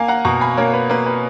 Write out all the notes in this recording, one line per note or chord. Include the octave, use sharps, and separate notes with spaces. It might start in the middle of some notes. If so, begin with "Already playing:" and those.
Already playing: A#3 F5 G#5
F#5 A#5
B2 A#5 C#6
G#5 B5
A#3 A#4 C#5
B4
A#3 B4
B4